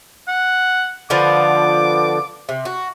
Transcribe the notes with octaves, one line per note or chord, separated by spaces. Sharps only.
F#5
D3 F3 B3 D6
C3
F#4